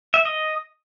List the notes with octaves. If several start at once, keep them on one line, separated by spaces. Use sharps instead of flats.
E5
D#5